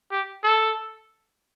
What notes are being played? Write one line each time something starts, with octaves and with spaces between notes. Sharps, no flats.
G4
A4